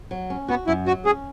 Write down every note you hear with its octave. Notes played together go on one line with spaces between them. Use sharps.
F#3
C#4
B3 F#4
F#2 E4
F#3 F#4
C#4 G#4